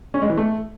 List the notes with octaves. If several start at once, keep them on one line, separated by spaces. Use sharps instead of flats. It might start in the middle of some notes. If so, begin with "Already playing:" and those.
C#4
G#3
E3
A3